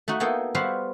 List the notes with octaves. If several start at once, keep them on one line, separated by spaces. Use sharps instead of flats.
A3 D#4 F#4
A#3 B3 D#4 E4 A4 G5
G3 B3 F#4 C5 E5 F5